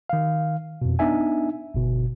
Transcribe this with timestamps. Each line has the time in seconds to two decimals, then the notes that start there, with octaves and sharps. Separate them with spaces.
0.10 D#3 F5
0.82 F2 B2
0.99 B3 D4 D#4 E5 G#5
1.74 G1 B2